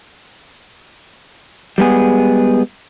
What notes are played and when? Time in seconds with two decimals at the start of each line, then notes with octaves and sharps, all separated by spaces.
1.78 G3 G#3 B3 G#4